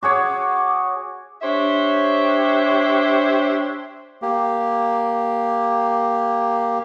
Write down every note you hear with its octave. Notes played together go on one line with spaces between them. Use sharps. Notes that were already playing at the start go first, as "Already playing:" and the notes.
F#4 G#4 C#5 D6
D4 G4 C5 C#5 E5
A#3 G4